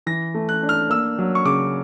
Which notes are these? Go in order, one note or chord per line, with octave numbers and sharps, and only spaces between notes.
E3 A#6
A3
F#6
D4
F6
A#3 E6
F#3
C#6
C#3 D6